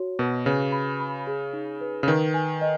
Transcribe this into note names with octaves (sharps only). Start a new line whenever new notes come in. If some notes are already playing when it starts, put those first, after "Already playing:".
Already playing: F#4 C#5
B2 A#4
C#3 B4
B5
B5
G#4
D#4
B4
C#3
D#3 B4
G#5
D#5